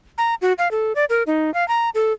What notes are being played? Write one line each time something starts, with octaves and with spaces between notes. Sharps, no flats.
A#5
F#4
F5
A4
D5
A#4
D#4
F5
A#5
A4